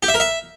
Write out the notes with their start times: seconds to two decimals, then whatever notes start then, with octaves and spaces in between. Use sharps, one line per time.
0.03 G4
0.08 E5
0.14 A#4
0.20 E5